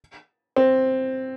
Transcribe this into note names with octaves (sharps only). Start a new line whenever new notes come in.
C4